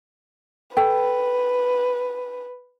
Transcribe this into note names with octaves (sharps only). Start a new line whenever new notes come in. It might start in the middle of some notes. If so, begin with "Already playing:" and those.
A4 B4 G5